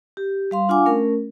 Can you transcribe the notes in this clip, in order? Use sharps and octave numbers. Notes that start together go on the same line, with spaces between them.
G4
G3 F5 C6
D4 F4 F5 F#5 G#5 D6
A3 C#4 A#4